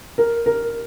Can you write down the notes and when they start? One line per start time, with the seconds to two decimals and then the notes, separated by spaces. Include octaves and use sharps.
0.18 A#4
0.46 A#4